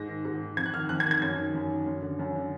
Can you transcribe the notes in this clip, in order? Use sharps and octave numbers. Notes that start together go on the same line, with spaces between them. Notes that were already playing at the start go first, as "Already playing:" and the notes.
Already playing: G#2 A#6
D#3
G#2
D#3
F2 G#6
F#6
D#3 F6
F2 F#6
G#6
D#3
G#6
F#2 G#6
D#3
F#2
D#3
F#2
D3
F#2
D3